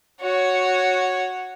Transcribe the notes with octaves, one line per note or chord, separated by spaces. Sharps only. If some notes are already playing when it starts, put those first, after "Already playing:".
F#4 C#5